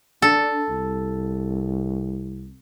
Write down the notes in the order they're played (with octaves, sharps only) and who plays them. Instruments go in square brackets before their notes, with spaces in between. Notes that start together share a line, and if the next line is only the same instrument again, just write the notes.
[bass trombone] D4 [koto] A4
[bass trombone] C2